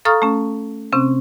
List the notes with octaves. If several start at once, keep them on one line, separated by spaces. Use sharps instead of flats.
A4 F5 A#5 C#6 D#6 F6
A3 C#4
C3 C4 C#4